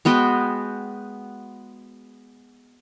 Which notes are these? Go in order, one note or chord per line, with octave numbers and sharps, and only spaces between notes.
G#3 B3 F#4 G5